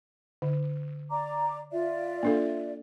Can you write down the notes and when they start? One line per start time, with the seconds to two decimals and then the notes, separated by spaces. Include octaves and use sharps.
0.42 D3
1.10 D5 A#5 D6
1.71 F4 D5 E5
2.23 A#3 D4 A4